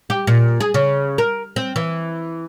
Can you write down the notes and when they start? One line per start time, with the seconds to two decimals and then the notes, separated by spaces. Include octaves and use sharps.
0.10 G4
0.27 A#2
0.60 G#4
0.74 C#3
1.18 A#4
1.56 C4
1.76 E3